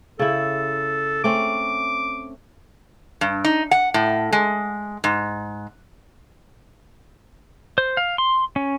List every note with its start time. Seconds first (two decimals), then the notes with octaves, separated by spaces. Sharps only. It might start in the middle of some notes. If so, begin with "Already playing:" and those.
0.19 C#3 E4 A4
1.24 A3 C4 C#4 D6
3.21 G2
3.45 D#4
3.71 F#5
3.94 A2
4.33 G#3
5.04 G#2
7.78 C5
7.97 F5
8.18 C6
8.56 C#4